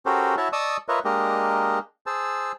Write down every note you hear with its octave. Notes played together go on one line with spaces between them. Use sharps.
C#4 F#4 G4 A4 A#4 C5
E4 F#4 C#5 E5 A5
D5 D#5 A5 C#6 D#6 E6
F4 A#4 B4 C#5 D#5 E5
G#3 A#3 D4 G4 A#4 D#5
G#4 C5 A5 E6